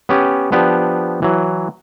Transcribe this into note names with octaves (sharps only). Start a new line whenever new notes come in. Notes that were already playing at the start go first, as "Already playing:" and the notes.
B3 C#4 G4 G#5
F3 B3 D4 G4
E3 F#3